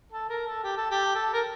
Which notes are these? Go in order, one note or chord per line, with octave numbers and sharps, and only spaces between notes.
A4
A#4
A4
G4
A4
G4
A4
A#4